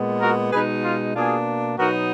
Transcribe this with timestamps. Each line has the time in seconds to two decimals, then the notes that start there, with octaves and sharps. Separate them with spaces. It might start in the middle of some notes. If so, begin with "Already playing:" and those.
Already playing: A#2 G#3 B3
0.21 F#4 A#4
0.52 B2 G#3 D#4 G#4 B4
0.84 F4
1.15 B2 A#3 D4 F4 G#4
1.78 B2 F#3 B3 D#4 F#4 A#4